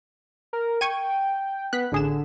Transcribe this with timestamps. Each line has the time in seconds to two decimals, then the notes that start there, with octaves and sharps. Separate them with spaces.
0.53 A#4
0.81 G5 C#6 G#6 D#7
1.73 B3 F#6 B6
1.92 A1 D3 G#4 E7